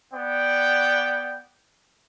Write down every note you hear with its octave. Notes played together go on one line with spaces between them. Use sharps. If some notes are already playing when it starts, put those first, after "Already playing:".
B3 D5 F#5 G5